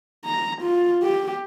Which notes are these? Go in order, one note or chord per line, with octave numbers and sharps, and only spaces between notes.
A#5
F4
G4